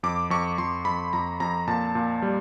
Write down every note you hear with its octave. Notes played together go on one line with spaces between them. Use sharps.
F2 D6
F2 C#6
F2 C6
F2 B5
F2 A#5
F2 A#5
A#2 A5
A#2
G3